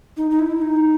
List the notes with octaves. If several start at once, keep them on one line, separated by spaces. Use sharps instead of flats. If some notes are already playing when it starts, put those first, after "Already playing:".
D#4
D#4
E4
D#4